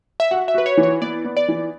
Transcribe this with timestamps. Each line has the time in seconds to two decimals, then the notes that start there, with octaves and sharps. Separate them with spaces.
0.20 E5
0.31 F#4 F#5
0.48 E5
0.54 F#4 B4
0.66 C#5
0.77 E3
0.83 C#5
1.01 B3 D5
1.24 B3
1.37 D5
1.48 E3